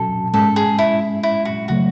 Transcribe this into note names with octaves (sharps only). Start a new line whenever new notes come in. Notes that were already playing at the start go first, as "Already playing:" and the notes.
Already playing: B2 F#3 C#4 F#4 A4
G#2 G#3 C#4 A4
G#4
E4
E4
F#4
C#3 F#3 A3 F#4